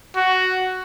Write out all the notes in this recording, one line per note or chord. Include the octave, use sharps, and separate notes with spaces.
F#4